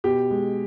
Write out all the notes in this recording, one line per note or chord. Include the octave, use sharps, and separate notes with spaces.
B2 G4
G#3